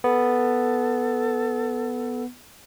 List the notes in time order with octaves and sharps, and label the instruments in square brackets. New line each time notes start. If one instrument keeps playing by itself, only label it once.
[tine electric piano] B3 [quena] A4